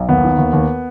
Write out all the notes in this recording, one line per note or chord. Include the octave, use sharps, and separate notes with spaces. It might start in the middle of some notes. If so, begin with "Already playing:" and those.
Already playing: B1
D#2 B3
D#3
D#2
D#2